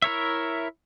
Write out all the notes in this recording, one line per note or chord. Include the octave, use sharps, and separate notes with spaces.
E4 A#4 C#5 E5